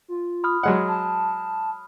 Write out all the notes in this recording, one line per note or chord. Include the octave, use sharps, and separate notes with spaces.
F4
B5 D#6 F6
F#3 G#3 F#5
A5